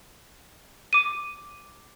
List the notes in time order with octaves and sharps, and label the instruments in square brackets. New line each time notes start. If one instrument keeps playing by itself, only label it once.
[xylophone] D6 D#7